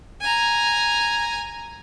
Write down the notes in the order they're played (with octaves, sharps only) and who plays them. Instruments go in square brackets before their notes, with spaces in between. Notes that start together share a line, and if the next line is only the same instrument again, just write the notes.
[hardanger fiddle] G#5 A#5